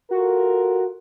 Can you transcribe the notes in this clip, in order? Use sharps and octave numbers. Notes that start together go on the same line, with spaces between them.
F4 F#4 A4 A#4